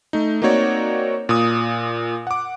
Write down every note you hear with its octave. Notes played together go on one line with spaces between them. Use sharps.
A3 D#4
A#3 C4 D#4 F#4 C#5 D5
A#2 D#6
F#5 D6